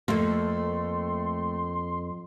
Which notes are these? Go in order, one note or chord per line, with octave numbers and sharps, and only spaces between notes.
F2 A3 A#3 C6